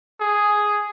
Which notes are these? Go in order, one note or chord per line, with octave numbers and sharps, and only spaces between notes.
G#4